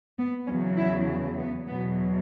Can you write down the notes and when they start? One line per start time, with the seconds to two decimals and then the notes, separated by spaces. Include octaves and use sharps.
0.18 B3
0.48 E2 C#3 F#3 C#4
0.77 E4
1.38 B3
1.68 E2 B2 F#3 B3